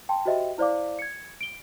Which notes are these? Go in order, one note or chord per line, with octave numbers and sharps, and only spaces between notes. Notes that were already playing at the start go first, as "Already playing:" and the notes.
G5 A5 C6
F#4 G4 C5 D#5 E5 G5
E4 C5 D5 F5 D6
G#6 C#7
D7 G7